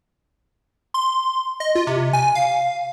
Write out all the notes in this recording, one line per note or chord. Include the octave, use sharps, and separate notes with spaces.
C6
D#5
F4
C3
G#5
F5